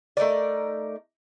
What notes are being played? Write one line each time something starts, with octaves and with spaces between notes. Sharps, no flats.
A3 D#4 A#4 D5